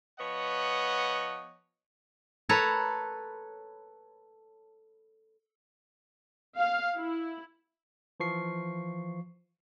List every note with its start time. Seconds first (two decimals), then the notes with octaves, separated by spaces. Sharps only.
0.19 F3 B3 C#5 D#5 F#5
2.49 A4 B4 C#5 A#5
6.57 F5
6.96 E4
8.20 E3 F3 C#6 C7